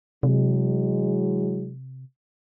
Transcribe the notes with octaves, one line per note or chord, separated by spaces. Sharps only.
C3 E3 F#3 G#3